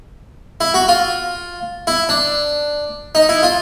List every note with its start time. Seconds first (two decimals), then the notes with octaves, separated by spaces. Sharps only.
0.61 E4
0.74 F#4
0.88 F4
1.87 E4
2.09 D4
3.15 D#4
3.29 E4
3.43 F4